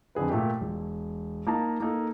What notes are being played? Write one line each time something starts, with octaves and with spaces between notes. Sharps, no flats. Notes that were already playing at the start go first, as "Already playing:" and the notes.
F2 D3 G#4 B4
A#2 A3 G4
E1
A#3 D#4 A5 A#5
A#3 D#4 A4